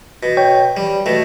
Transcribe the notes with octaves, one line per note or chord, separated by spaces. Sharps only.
B2
C#5 G5
G3
B2 A3